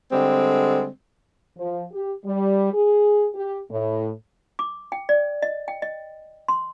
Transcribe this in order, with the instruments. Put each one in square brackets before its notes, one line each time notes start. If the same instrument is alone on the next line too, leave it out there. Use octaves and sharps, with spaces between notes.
[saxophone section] D3 G3 G#3 C4
[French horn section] F3
G4
G3
G#4
G4
A2
[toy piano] D6
G5
D5
D#5
G5
D#5
C6